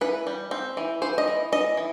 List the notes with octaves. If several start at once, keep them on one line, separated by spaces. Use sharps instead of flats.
E3 B4
G3
C4
E3
E3 C5
D#5
E3
E3 D#5
E3